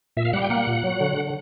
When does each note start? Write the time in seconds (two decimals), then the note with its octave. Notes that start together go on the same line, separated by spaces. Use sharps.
0.17 A#2 E5
0.25 F5
0.33 G3 F#5
0.42 G5
0.50 A#3 F#5
0.67 A#2
0.84 F#3
1.00 D3
1.17 D3